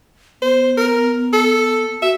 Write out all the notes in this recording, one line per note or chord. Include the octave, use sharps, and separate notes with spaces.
B3 C5
A#4
A4
F#4 E5